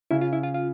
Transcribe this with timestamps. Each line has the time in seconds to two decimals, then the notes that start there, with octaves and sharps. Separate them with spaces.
0.11 C#3 E4
0.21 F4
0.33 E4
0.43 F4
0.54 F4